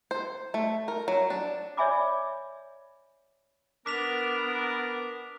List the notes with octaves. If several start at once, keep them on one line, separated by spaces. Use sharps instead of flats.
C5
A3
A#4
F#3
D4
C#5 D5 E5 G#5 B5 D6
B3 D4 A#4 D6 B6 F7